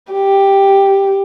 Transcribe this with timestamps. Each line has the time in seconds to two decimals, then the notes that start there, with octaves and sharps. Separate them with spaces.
0.12 G4